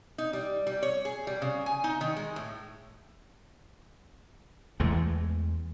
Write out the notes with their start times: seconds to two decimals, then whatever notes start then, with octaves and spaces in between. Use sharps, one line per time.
0.18 D#4
0.33 G3
0.67 G3
0.82 C#5
1.05 G#4
1.27 G3
1.42 C#3
1.66 G#5
1.84 D#4
2.01 D#3
2.16 G#3
2.36 A2
4.80 E2 E3 G#3 A3